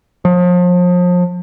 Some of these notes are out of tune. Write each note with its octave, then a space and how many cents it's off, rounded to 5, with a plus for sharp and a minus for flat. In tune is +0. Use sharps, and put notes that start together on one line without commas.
F3 +35